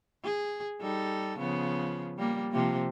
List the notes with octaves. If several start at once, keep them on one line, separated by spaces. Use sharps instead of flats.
G#4
G3 D#4 A4
C#3 F3 B3
G3 A#3
C3 F3 A#3